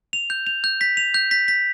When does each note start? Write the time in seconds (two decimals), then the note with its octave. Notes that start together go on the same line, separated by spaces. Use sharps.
0.13 F7
0.30 G6
0.47 F7
0.64 G6
0.81 B6
0.97 F7
1.14 G6
1.31 B6
1.48 B6